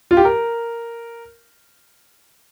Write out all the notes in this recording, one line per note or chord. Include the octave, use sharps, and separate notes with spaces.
F4
G4
A#4